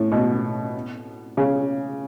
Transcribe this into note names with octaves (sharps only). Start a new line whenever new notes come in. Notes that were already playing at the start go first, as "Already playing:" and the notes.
Already playing: A2
B2
C#3